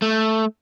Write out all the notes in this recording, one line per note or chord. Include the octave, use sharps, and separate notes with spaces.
A3